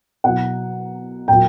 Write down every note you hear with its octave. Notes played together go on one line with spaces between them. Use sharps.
B2 F#3 F#5
A#2 F#3 G5